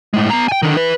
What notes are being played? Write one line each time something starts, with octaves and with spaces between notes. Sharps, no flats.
A2 G#3
B3 A#5
G5 G#5
D3 D#3
E4 B4